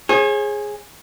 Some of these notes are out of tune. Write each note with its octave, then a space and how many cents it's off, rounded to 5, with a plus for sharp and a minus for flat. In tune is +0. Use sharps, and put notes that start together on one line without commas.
G#4 +0 C#5 -45